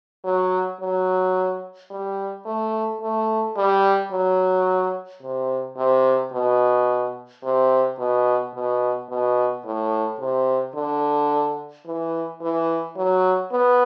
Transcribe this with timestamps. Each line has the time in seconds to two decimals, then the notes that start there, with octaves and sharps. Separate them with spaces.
0.24 F#3
0.80 F#3
1.90 G3
2.46 A3
3.02 A3
3.57 G3
4.12 F#3
5.22 C3
5.77 C3
6.33 B2
7.44 C3
7.98 B2
8.54 B2
9.09 B2
9.65 A2
10.20 C3
10.75 D3
11.86 E3
12.41 E3
12.97 F#3
13.52 B3